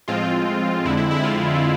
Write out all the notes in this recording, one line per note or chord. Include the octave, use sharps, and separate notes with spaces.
A2 F3 G#3 C4 F4
F2 D3 G#3 C4 E4
E4
E4
F4